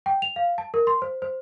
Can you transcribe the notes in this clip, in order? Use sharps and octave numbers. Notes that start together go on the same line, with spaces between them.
G5
F7
F5
A5
A#4
C6
C5
C5